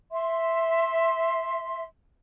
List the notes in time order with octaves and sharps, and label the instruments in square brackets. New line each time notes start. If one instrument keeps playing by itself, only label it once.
[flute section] E5 C6